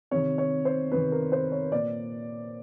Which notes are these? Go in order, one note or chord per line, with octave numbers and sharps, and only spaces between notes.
C3 D#3 C#5
C#5
C5
C3 D#3 B4
A#4
C5
C#5
A#2 D5